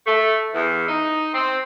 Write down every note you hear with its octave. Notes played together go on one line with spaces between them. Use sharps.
A3
E2
D#4
C4